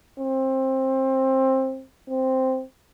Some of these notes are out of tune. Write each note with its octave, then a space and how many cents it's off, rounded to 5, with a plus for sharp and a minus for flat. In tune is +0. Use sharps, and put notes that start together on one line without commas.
C4 +20
C4 +0